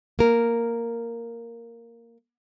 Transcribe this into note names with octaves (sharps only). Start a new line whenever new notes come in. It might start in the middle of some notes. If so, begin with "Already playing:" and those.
A#3 A#4